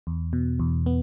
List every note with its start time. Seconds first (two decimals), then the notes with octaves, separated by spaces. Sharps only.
0.07 E2
0.33 B2
0.60 E2
0.86 B3